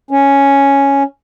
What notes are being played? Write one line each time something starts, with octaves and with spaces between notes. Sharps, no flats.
C#4